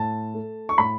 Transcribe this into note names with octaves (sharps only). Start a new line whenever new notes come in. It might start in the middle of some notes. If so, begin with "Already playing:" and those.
Already playing: A2 A5
A3
C#6
A2 B5